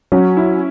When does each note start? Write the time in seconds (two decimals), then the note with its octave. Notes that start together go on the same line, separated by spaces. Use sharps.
0.12 F#3 C#4
0.37 E4